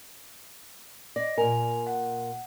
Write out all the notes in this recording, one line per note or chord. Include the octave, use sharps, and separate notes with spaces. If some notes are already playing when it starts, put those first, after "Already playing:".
D5 D#5 A#6
A#2 A#4 G#5 F7
F#5